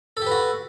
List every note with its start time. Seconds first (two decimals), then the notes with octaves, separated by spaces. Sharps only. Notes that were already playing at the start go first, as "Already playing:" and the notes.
0.17 A4
0.22 G4
0.26 B4
0.31 F#4